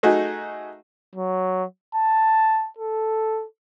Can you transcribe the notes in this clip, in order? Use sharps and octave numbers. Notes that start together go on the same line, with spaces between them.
A3 D#4 F#4 G#4
F#3
A5
A4